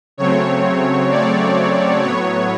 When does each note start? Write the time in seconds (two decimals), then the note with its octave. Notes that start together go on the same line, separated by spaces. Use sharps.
0.17 C#3 F#3 A3 C4 C#5
1.10 D5
2.03 A2 F#3 B3 C#5